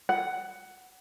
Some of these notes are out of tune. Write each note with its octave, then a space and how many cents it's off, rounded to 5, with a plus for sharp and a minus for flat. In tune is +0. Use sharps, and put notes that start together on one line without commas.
F#5 +10